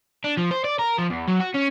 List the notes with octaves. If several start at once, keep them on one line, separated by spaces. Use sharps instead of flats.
D4
F3
C5
D5
A#4
F3
E2
F#3
F#4
C#4